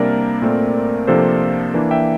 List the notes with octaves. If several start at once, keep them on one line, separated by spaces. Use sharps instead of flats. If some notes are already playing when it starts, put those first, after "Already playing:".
Already playing: C3 G3 A#3 D4 A#4 D5
A#2 A3 C4
C3 F3 A#3 D4 A4 C5
E3 A#3 D4
E5 G5